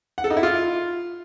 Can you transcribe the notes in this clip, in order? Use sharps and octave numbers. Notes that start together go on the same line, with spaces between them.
F#5
A4
D#4
E4
F4